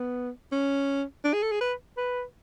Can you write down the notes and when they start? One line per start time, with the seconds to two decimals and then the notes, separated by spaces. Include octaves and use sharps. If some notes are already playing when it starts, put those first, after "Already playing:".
Already playing: B3
0.52 C#4
1.25 D4
1.33 G#4
1.43 A4
1.52 G#4
1.61 B4
1.97 B4